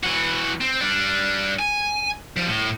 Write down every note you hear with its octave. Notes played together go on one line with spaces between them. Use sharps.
E3 F#4
C4
G3 D4
G#5
F3 G3
A2